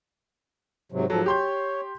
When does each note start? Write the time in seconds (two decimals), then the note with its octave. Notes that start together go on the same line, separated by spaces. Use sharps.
0.92 G#2 C3 F#3
1.10 G#2 F3 F#3 A4
1.26 G4 C#5 C6 G6